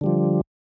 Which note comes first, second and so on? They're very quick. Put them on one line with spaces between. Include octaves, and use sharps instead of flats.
D3 G3 F3